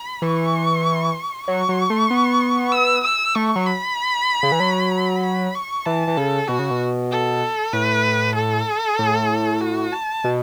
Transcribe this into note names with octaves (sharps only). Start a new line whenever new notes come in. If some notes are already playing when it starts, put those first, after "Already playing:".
Already playing: B5
E3 C#6
F#3 C#6
F#3
A3
B3
E6
E6
A3 C#6
F#3
B5
C#3
E3
F#3
B5
C#6
E3 A5
E3
C#3 A4
B2 F#4
C#3
B2
A4
A2 B4
A4
A2
F#4
A5
B2